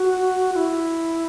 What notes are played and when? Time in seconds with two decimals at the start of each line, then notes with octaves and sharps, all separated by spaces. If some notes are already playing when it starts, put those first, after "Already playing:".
Already playing: F#4
0.52 F#4
0.56 E4